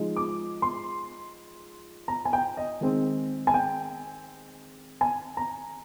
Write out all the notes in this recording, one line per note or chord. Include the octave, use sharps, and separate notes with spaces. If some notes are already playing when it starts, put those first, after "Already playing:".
Already playing: F3 G#3 D#4
D6
C6
A#5
G#5
G5
D#5
D#3 G#3 C4
G#5
G5
G#5
A#5